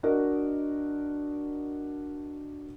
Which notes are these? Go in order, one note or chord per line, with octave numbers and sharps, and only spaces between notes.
D4 F#4 A#4 D#5